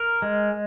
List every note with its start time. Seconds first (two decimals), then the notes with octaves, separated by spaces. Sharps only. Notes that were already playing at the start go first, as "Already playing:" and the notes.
Already playing: A#4
0.22 G#3